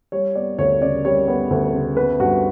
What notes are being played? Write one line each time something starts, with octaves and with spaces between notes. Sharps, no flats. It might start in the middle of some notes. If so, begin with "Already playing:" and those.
G3 C#5
B3 D5
D2 C#5
C#3 D5
G3 C#5
B3
D2
C#3
B3 B4
G2 F#4